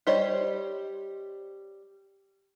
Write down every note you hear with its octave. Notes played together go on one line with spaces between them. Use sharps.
G3 G4 C5 C#5 D#5